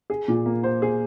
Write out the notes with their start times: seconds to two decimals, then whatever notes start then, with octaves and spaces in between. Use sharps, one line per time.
0.10 G#4
0.28 A#2
0.46 A#3
0.63 C5
0.82 G#4